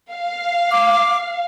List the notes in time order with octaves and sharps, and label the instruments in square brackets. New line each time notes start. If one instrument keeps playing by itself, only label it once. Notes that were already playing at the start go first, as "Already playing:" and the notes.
[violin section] F5
[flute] D6